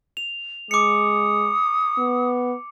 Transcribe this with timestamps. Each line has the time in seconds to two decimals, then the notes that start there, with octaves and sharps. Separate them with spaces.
0.17 F7
0.71 G#3 D6 D#6 C#7
1.98 B3